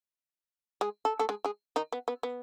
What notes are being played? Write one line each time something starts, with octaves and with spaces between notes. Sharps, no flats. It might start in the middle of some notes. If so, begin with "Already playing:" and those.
G#3 G#4
A4
A3 A4
G#3 G#4
G#3 G#4
D#3 D#4
B3
B3
B3